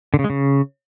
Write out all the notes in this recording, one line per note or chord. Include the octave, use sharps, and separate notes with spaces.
D3
C#3
G#3
C#3